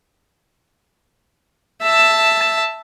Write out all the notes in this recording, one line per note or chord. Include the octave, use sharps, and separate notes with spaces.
E5 A5